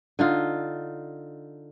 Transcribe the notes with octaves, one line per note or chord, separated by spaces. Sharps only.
D3 D#4 F4